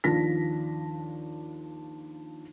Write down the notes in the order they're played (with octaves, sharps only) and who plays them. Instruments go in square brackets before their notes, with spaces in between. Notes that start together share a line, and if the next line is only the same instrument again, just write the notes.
[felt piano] D#2 F3 D4 A#6 B6